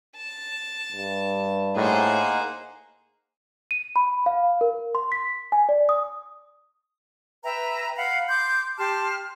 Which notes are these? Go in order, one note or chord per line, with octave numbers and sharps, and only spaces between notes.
A5
G2
A2 A#3 D#4 G#4 C5 F#5
D#7
B5
F5
A#4
C6
B6
G#5
D5
D#6
B4 E5 G5 A#5
F5 F#5 B5
C6 D6 G6
G4 A5 C6 F6